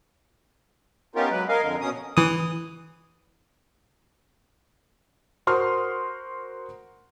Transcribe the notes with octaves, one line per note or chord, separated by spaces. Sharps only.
B3 C#4 D#4 F4 G4 A#4
F#3 G#3 B4
A#4 D#5 F5 G#5
F2 D3 A#4
B2 C#4 D#6
E3 D#6
F#4 A#4 C5 C6 D#6 F6